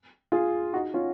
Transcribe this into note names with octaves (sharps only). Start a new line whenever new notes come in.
F4 G#4
D#4 F#4
C#4 F4